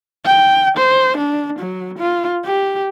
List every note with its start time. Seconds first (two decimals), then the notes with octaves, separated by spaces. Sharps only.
0.25 G5
0.77 C5
1.17 D4
1.59 F#3
1.98 F4
2.44 G4